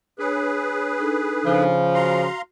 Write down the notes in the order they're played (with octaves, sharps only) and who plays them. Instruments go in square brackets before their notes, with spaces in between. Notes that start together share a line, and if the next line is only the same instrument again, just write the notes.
[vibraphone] D4 C#5 [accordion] G#4 B4
[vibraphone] D4 D#4 A4
[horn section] C#3 F3
[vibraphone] F#4 [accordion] F5 A#5 C6